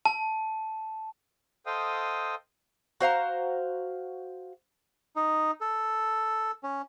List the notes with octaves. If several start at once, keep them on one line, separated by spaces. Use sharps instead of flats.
A5
A4 C5 D#5 F5 G5 D#6
F#4 C5 F5 A#5
D#4
A4
C#4